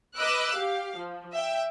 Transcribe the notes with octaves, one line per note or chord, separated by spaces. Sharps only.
B4 D#5 D6 E6 F#6
G4 F5
F3
E5 G5